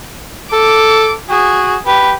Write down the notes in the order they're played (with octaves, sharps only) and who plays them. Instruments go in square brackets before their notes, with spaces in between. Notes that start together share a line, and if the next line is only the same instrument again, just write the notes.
[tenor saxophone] A4 [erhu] D6
[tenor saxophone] F#4 [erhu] G#4
[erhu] G4 [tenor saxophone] B4